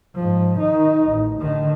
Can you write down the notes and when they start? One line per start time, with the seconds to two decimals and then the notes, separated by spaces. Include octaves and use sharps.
0.15 G#2 F3
0.59 D#3 D#4
1.11 A1
1.40 D3 D#3